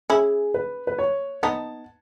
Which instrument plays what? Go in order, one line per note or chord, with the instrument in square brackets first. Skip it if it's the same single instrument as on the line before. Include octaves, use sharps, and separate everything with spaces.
[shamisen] C#4 E4 [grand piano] G#4
[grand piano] B4
B4
C#5
[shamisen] B3 D#4 [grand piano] A5